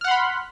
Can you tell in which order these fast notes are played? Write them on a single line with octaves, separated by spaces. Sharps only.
F6 F#5 C6 B5